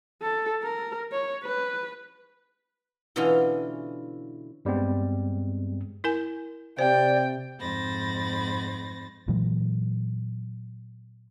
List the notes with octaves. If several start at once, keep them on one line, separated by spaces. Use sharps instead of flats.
A4
A#4
C#5
B4
B2 D3 E3 C#4 E4 F4
G2 G3 G#3 B3 C4
E4 A#4 G#5
C3 C5 D5 G5
F2 G#2 C5 B5 A6 A#6
A#2 E3 F#3 G#3